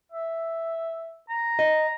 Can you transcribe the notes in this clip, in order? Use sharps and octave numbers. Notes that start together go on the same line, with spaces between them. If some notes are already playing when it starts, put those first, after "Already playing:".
E5
A#5
D#5